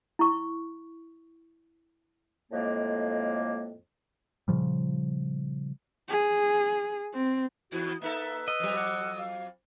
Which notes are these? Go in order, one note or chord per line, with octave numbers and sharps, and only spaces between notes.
E4 C#6
F2 A2 G#3 A#3
A#2 C#3 F3 G3
G#4
C4
E2 B3 E4 F#4
A#3 D#4 A4 B4 E5
D#5 E6
F2 F#3
F#5
F5